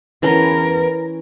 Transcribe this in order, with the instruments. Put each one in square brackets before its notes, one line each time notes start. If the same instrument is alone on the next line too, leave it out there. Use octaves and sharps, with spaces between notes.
[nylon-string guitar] E2 B4 A5 [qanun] E3 C#4 C6 [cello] A#4